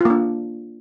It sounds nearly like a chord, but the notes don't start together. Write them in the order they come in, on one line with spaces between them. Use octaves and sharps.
F4 A#3 D4